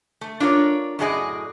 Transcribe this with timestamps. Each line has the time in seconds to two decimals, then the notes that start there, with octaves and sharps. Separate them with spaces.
0.21 A3
0.40 D4 F4 A#4 C#5
0.99 F#2 A2 F#4 G#4 D5 D#5